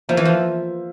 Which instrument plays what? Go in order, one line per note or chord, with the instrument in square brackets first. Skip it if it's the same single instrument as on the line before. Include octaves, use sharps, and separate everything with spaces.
[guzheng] F3 [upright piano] A#3 F4 C5 E5
[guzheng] E3
F3